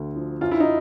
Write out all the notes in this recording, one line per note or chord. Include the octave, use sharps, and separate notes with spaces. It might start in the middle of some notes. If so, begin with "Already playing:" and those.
Already playing: D2 D3
F3
F#2 F4
E4
D#4